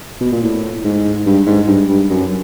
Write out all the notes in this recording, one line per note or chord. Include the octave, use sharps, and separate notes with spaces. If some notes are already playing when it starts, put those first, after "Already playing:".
B2
A#2
A2
G#2
G2
G#2
G2
G2
F#2